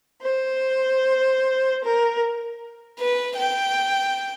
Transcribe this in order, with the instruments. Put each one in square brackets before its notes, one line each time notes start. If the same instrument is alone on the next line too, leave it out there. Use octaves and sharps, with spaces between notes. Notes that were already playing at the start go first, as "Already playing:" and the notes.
[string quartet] C5
A#4
[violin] B4
G5